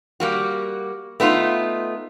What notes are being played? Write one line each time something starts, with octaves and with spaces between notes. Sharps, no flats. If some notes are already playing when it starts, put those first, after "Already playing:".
G3 A#3 F#4
A3 B3 D#4 F4